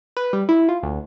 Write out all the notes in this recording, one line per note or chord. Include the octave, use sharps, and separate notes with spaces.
B4
G3
E4
F4
D2